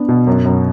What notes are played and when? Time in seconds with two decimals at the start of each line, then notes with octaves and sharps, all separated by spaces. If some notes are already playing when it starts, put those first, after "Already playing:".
Already playing: B3 D4
0.09 B2
0.27 F#2
0.45 F#2